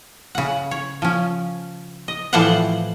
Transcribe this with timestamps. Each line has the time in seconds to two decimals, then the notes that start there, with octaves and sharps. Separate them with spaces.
0.35 C#3 F#5
0.71 C#5
1.02 F3 C#4
2.08 D#5
2.33 A2 E3 F3 C5 D5 F#5